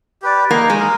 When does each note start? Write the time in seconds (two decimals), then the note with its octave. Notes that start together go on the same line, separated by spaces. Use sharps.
0.22 G4 B4 D5
0.50 A#3 D#4
0.70 G#3
0.79 A#4